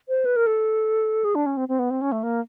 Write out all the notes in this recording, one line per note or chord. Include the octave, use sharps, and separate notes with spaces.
C5
B4
A#4
A4
G#4
D4
C#4
C4
C4
B3
C4
C#4
A3
A#3